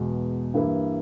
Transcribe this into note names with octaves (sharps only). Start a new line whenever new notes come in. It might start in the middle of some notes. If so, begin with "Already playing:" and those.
Already playing: E2 B2 G#3
G2 E3 A#3 E4